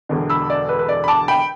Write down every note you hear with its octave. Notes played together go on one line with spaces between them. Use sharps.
E1 E2 D3
B5 E6
D5
B4
B4
D5
B5
A5 D6
G5 B5